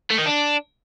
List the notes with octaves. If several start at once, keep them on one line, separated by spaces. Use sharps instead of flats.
A3
D#3
D4